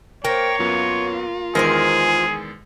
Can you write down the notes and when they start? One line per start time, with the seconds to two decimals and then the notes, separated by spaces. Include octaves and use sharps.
0.25 A#3 A#4 C5 C#5 G5
0.60 F#2 B3 F4
1.55 E2 D#3 G#3 G#4 A#4 C5 G#5